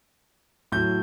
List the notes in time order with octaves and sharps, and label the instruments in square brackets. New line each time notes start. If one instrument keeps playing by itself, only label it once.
[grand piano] A2 F#3 G6